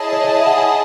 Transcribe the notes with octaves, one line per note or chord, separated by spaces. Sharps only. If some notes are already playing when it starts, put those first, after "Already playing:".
Already playing: E4 G#4 C#5 D#5 A5
C#5
C#5
E5
F#5
G#5